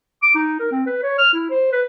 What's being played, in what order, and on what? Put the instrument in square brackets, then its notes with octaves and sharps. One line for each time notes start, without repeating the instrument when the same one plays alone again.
[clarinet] D6
D#4
A#4
C4
B4
C#5
F6
E4
C5
B4